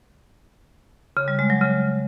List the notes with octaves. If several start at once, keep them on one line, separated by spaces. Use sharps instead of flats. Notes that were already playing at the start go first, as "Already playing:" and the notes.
C#3
G3
G#3
F#3
C#3